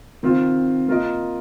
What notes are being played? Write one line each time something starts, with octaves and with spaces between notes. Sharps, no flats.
D#3 C4 F4
A#3 F4 A#4 D#5